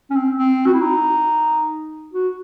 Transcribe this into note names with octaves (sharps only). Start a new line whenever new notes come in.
C#4
C4
C4
F#4
E4
D#4
F#4